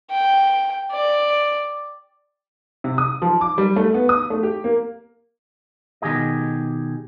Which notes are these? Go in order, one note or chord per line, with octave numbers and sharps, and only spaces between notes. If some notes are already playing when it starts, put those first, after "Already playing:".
G5
D5
C3
D#6
F3
D6
G3
A3
B3
D#6
A3
G4
A#3
B2 D#3 G4 G#4 D#5